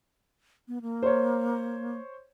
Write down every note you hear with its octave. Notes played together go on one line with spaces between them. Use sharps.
B3
A#3
C5 C#5